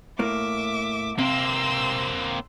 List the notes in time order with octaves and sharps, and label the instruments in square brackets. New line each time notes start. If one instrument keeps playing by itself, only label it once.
[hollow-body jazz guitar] A2 A#3 [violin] E5 D6
[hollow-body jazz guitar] C3 [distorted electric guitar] A#3 C4 [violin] C6 E6